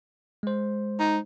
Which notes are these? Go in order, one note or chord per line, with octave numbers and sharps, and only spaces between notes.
G#3 C5
D#4